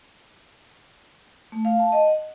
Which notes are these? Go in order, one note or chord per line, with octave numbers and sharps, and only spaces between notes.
A3
F5
A5
D#5
F#5